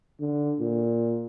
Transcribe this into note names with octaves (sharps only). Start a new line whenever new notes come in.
D3
A#2